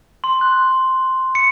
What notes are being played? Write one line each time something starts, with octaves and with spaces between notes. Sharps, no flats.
C6
F#6
C#7